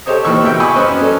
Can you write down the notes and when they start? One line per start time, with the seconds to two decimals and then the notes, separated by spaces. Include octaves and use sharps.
0.06 G4 A4 C5 C#5 D#5
0.24 D#2 A#2 D#3 E3 C#6 E6
0.42 G#1 B2 E3 E5 G5
0.60 D#5 G#5 B5 C#6 D6 E6
0.75 F#2 C#4 B4 C5 D#5 F#6
1.01 C#4 D4 A4